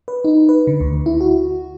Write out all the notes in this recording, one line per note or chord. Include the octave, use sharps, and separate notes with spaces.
B4
D#4
B4
D3
D2
E4
F#4